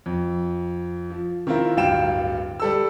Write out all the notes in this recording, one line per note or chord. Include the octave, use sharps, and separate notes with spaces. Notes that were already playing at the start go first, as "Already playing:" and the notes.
F2
F3
D#3 C4 E4 F4 A#4
D1 G2 F5 G5 E7
G3 A4 E6